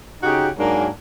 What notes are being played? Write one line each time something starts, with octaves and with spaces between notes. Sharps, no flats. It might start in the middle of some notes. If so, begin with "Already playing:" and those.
C#3 D#4 F#4 G4
G#2 F#3 A#3 D4 A#4 G#5